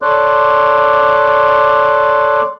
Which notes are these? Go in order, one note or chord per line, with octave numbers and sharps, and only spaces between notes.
A4 C#5 D5 C6 D6 F#6